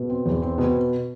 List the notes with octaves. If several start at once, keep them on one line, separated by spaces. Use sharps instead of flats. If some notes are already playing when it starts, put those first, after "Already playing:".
Already playing: B2
C4
E2
C4
B2